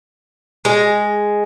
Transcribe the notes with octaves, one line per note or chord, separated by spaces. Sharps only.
G#3